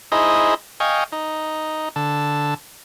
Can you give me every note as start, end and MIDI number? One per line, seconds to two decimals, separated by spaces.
0.12 0.54 63
0.12 0.54 64
0.12 0.54 68
0.12 0.54 72
0.12 0.54 75
0.80 1.04 75
0.80 1.04 77
0.80 1.04 79
0.80 1.04 80
0.80 1.04 85
1.12 1.89 63
1.96 2.54 50
1.96 2.54 69